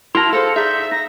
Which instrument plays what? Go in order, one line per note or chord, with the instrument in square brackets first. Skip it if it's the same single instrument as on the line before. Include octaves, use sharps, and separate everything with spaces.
[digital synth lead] E4 [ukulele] F#4 A#4 A5 [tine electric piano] C6 A#6 [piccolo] F7
[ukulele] G#4 C5 F5 [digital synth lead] A4 [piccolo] C#7
[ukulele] D#4 G#4 D5 [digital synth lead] E5 [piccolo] G6
[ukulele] D#4 [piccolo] A#6